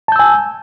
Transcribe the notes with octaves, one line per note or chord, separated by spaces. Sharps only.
G#5 A5 E6 G6